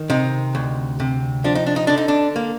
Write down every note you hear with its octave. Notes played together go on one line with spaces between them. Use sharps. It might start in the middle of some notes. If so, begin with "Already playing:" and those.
Already playing: D#3
C3 D#4
D2
C3
F3 D4
D#4
D4
D#4
D3 D4
D#4
D4
A#3